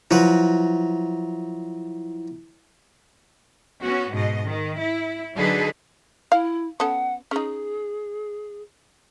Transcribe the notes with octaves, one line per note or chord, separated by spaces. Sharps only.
F3 F#3 E4 B4
B3 C#4 F#4
G#2 B2 D#5
D#3
E4
D3 F#3 D#4 G#4 A4 B4
E4 F5
B3 C#4 A4 F#5
C#4 D#4 G#4